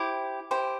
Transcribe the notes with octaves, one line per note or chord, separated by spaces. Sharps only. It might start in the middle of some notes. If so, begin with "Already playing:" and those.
Already playing: E4 G4 C5 D6
E4 G4 C5